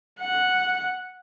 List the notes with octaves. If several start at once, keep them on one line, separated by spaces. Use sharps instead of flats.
F#5